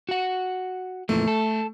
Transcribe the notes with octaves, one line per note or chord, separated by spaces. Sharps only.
F#4 F#5
F2 A#2 E3 A3
A4